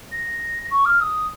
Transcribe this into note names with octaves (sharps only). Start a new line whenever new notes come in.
A#6
C#6
F6
D#6